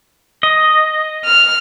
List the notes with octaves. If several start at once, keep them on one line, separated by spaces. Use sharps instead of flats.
D#5
F6